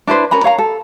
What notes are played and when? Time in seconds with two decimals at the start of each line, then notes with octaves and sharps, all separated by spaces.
0.07 D4 E4 B4 C5
0.31 C#4 A#4 A#5 B5
0.44 C#5 F5 A#5
0.58 A4